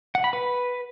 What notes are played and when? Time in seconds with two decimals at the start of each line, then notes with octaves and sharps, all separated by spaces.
0.15 F#5
0.24 B5
0.33 B4